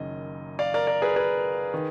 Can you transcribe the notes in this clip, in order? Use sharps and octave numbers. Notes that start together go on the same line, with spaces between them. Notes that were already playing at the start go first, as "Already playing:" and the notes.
Already playing: F#1 F#2 D#3 D#5
D5 F5
A#4 D5
A#4 D5
G#4 B4
G#4 B4
D#3